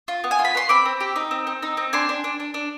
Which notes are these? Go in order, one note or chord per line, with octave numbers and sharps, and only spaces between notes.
F4
B3
G#5
F4
B5
B3 C6
C4 B5 D6
C4
G4
D#4
C4
C4
D#4
C4
D4 G#5 C6
D4
D4
D4
D4